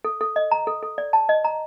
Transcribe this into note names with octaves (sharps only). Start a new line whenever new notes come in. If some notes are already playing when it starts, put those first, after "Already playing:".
A4
A4
D#5
A#5
A4
A4
D5
A5
D#5
A#5